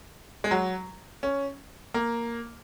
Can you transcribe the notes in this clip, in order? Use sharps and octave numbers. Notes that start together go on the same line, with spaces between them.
G#3
F#3
C#4
A#3